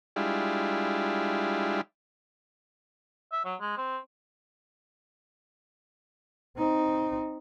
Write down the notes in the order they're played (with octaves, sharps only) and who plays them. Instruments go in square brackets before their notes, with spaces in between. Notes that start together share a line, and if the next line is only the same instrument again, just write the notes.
[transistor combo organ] G3 G#3 D4 E4 F4
[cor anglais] E5
F#3
G#3
C4
[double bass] C4 D#4